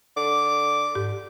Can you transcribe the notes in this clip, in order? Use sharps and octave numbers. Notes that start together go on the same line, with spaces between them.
D3 D6
G#2 G4